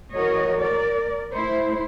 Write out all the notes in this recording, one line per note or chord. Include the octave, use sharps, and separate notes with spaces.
E3 F#4 A#4 C#5 D#5
A#4 D5
A3 E4 C5